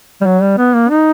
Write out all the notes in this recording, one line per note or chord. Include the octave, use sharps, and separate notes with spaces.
G3
F#3
G3
B3
A#3
D#4